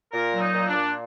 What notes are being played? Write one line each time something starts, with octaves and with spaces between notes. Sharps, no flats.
A#2 A#4
F#3
D#4
A#2
D4
A#2